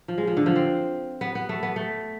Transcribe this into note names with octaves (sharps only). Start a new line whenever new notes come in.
F3
G#3
F3
D3
F3
C4
B3
B3
A3
B3
A3